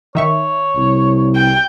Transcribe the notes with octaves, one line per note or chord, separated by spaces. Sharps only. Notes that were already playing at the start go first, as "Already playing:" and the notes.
D#3 C#5 E5 C#6
C2
G5